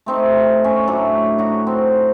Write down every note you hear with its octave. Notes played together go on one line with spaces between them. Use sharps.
A3 C4 D#4
C#4
A2 F#3 D4 A4
D#4 F#4
C4